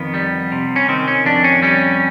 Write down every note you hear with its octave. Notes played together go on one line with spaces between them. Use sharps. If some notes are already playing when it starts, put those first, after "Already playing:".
Already playing: F2 D#3 B3
G3
C3
C#4
D#3 C4
C#4
F2 D4
C#4
G3 C#4